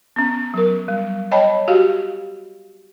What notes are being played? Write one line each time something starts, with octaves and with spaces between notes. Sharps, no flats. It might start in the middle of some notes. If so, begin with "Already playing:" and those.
B3 C#4
F#3 A#4
G3
C#5 D#5 G5 A5 B5
F#4 G4 F5